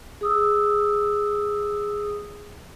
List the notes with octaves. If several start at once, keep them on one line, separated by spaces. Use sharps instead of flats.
G#4 D#6 E6